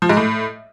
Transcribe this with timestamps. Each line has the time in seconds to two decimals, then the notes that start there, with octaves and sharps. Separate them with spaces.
0.02 F3
0.09 G#2
0.17 A2